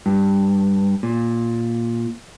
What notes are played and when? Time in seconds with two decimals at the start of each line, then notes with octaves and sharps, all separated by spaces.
0.06 G2
1.03 A#2